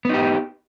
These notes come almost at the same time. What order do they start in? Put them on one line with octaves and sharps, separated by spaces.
B3 D#4 G4